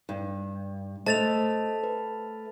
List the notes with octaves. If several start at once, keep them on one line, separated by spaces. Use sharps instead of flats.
G2
A3 C5 D#5 E5 A5 A6 F7
B4